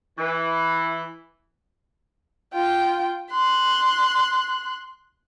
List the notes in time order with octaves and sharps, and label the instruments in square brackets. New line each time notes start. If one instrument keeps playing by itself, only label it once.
[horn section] E3
[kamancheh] F4 G5
C6 F#6